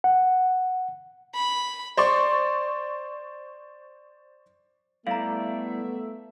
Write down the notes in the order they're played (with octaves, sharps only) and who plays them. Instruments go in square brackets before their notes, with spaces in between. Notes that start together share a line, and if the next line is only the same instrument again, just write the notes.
[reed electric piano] F#5
[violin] B5
[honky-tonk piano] C5 D5 C#6
[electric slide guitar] G3 E4 D5 [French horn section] A3 [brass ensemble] B3 E5 [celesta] F5 A#5